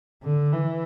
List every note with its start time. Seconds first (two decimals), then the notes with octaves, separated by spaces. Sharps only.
0.23 D3
0.53 E3